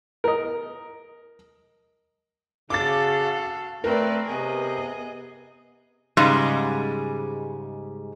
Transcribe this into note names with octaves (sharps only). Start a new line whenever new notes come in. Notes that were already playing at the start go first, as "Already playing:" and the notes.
A#4 D#5
C#3 F#4 A4 F5 D6 A6
A3 C4 A#4 B4 D5
C3 B3 G#4 D#5
G#2 C#3 G3 G#3